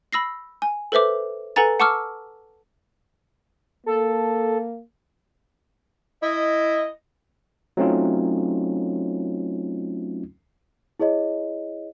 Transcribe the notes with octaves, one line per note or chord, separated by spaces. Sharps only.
B5 E6 A#6 C7
G#5
A4 B4 C5 E5 D6
A4 B4 F#5 G#5 A#5 A6
F#5 A5 C#6 D6 E6 F6
A#3 A4
E4 D#5
F#3 A3 C4 C#4 D#4 F4
E4 G#4 C#5 D#5